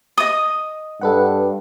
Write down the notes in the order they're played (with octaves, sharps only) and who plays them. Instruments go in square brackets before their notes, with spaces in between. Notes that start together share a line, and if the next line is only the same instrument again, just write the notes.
[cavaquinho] D#5 D#6
[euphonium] G2 [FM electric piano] A4 B4 F#5